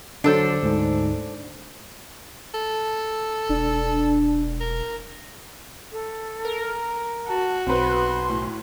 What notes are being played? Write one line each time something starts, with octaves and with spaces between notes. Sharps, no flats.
D3 F#3 D4 A4 C5
D2 G#2
A4
E1 D4
A#4
A4
A#4
F#4 A5
B1 C4 B4 C6
A2